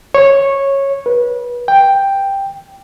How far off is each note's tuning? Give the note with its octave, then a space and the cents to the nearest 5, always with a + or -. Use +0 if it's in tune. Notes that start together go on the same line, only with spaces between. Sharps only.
C#5 -10
B4 -30
G5 +5